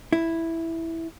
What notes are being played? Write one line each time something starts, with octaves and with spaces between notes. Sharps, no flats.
E4